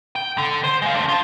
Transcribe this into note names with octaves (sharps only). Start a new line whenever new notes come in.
G5
D3
C5
G#3 F5
D4 C5
F4 A5